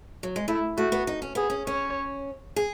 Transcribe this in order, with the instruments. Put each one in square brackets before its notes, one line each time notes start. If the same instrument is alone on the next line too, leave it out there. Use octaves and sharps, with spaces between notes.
[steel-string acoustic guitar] F#3
G#3
[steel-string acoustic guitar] A3 [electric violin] E4
[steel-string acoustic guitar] A3 [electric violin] F#4
[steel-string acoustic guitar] B3
D#4
C#4
[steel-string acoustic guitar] B3 [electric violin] G#4
[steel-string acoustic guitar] C#4
[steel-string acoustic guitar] C#4 [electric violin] C#5
[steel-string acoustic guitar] G#4